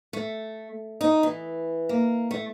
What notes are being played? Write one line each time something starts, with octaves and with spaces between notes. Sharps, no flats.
A3
D#4
E3
A#3
A3